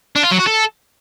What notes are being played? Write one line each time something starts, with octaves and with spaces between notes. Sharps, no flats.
D4
F4
F#3
F#4
A4